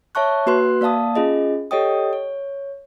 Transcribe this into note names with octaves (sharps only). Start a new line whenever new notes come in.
C#5 E5 A5 C#6 F#6
A#3 F#4 B4 C6 F#6
A#3 D5 F5 A5 D#6
C#4 F4 G#4 D#5
G4 A4 C#5 D#5 G5 D#6
C#5